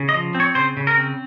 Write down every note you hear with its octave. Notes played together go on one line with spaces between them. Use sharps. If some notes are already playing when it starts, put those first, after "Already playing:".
Already playing: C#3
D#5
F3
C4
C#5
C#3 C5
C#3
A#4
C4